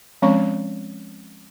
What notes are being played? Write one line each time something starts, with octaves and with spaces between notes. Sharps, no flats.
F3 G#3 C4 C#4 C#5 C#6